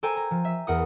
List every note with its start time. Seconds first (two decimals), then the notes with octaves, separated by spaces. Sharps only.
0.03 A4 C5 G5 G#5 A#5
0.16 A#5
0.31 F3
0.45 E5
0.67 E2 A#4 F#5 D#6